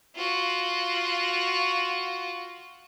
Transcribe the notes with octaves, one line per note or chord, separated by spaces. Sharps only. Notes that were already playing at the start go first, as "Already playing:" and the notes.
F4 F#4